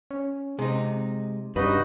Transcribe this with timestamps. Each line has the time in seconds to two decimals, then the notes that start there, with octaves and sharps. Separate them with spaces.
0.11 C#4
0.59 C3 G#3 D#4
1.56 G2 C#3 D#4 F#4 B4 D#5